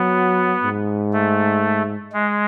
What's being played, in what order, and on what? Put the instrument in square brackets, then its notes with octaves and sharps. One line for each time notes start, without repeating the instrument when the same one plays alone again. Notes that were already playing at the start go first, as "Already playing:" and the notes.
Already playing: [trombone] F#3 [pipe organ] B3
[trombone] G#2
[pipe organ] A3
G#3